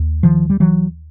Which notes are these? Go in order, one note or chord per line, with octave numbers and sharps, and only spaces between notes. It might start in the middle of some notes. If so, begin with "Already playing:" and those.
Already playing: D#2
D#3 F3
G3
E3 F#3